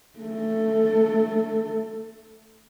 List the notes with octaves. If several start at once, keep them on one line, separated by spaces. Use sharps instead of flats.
A3 A4